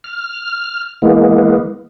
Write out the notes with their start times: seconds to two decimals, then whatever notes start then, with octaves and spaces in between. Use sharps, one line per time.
0.04 F6
1.02 E3 G#3 A#3 B3